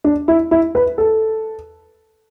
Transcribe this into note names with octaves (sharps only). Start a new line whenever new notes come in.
D4
E4
E4
B4
A4